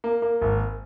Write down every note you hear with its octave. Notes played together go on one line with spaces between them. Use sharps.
A#3
A#3
G#1